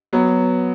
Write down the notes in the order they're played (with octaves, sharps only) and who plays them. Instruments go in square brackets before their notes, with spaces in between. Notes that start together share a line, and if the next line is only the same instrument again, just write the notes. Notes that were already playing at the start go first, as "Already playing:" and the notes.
[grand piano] F#3 B3